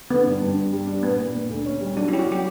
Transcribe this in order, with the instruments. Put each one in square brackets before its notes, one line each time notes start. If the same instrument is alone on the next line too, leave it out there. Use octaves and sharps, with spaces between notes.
[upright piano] D3 [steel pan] B3
[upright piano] G2
G2
G3
G3
D4
[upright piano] A#2 [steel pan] B3
[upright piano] A#2
A#2
D2
C#4
G3
[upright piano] F#3 [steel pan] D4
[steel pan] E4
[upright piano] C#4 [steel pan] G4
[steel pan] F#4
[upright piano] F#3
[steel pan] G4